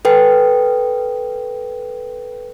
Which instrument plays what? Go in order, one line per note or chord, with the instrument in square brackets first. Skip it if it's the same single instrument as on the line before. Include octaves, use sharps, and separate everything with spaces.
[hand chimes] A4 B4 G5